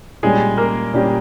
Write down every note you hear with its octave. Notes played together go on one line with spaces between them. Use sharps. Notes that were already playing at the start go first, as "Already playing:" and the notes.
A#2 G3 G#3 C#4 G4 G#4
A#3 A#4
A#2 G3 C#4 G4